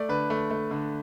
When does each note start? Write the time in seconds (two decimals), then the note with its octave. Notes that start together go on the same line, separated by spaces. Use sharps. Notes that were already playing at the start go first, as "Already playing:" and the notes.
Already playing: A3 D5
0.09 D3 B4
0.30 A3
0.50 A3
0.71 D3